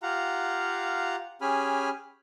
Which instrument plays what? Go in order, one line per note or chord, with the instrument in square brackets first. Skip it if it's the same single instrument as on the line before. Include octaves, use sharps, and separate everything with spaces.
[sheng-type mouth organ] F4 G4 F5 F#5 A#5
C#4 G4 G#4 G#5 B5 F6